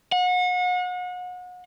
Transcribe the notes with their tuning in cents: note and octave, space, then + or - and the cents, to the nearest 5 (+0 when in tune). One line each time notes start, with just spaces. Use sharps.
F#5 -35